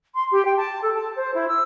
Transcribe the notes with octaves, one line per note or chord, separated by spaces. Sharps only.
C6
G4
G5
A5
A4
A5
C5
E4
E6